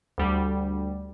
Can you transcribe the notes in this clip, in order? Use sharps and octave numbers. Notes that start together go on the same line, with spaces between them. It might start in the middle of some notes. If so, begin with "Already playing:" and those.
D2 G3